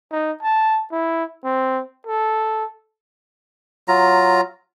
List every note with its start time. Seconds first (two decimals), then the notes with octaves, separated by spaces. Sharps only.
0.12 D#4
0.43 A5
0.92 E4
1.44 C4
2.07 A4
3.88 F#3 F4 A#5